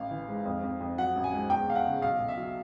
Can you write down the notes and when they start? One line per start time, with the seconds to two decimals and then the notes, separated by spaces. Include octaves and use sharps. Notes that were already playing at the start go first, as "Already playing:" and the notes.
Already playing: A1 F5
0.11 E3
0.28 G#2
0.45 F2
0.63 F2
0.81 F2
0.98 F#3 F#5
1.16 A1
1.24 G#5
1.33 G#2
1.50 E2 G5
1.67 E2 F5
1.76 F#5
1.85 C#3
2.02 B1 F5
2.20 B1
2.28 E5
2.37 F#3